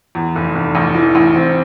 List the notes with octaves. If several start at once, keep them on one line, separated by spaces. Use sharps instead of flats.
E2
F1
F1
A1
E3
A1
C4